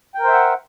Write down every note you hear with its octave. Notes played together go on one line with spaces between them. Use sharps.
A#4 C5 E5 F#5 G5